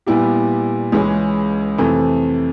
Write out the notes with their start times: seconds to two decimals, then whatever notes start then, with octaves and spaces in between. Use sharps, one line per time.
0.06 A#2 G3 B3 E4 G4
0.92 C#2 C#3 E3 G#3 C#4
1.78 F2 C3 E3 A3 C4